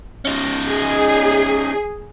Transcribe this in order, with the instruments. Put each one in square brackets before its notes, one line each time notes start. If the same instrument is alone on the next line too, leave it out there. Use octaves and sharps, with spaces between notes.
[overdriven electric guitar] C#4 D#4
[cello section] G#4